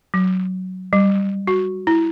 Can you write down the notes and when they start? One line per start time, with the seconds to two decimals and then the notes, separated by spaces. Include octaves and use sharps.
0.14 F#3
0.93 G3
1.47 F#4
1.87 E4